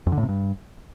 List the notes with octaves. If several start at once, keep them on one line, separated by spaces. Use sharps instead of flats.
F2
D3
A2
C3
G2